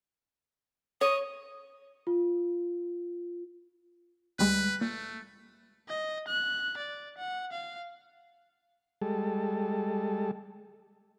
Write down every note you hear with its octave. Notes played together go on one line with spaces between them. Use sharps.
C#5 D#6
F4
D2 G3 G#3 B4
A#2 A3
D#5
F#6
D5
F#5
F5
G3 G#3 A4